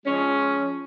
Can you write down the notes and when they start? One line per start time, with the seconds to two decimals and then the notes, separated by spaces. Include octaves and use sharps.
0.06 F3 G#3 C#4